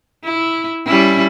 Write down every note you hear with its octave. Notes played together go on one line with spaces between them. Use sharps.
E4
G3 C#4 E4